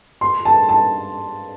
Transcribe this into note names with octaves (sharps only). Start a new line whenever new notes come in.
C6
A5
A5